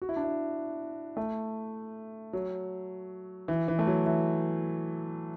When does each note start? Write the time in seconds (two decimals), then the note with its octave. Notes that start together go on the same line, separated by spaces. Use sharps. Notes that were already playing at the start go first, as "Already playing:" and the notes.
0.02 F#4
0.09 E4
0.16 D4
0.24 E4
1.17 A3
2.33 F#3
3.48 E3
3.68 E3
3.79 A3
3.87 F#3
4.06 E3